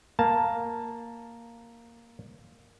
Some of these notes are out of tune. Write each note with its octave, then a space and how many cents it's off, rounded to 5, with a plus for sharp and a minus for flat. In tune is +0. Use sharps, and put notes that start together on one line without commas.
A#3 +0 A5 +0